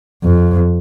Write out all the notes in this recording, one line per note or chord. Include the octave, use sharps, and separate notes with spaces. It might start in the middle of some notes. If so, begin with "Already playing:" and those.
F2